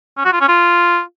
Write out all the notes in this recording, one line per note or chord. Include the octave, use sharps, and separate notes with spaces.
C#4
F#4
F4
C#4
F4